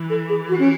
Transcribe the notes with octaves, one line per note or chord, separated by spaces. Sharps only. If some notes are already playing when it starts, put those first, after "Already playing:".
Already playing: E3
A4
G#4
F#4
C#4